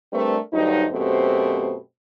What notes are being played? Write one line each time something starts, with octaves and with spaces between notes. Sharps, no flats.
G3 A3 C4 D4 A#4 B4
D2 G2 F#3 D#4
F#2 B2 A3 C4 G4 C5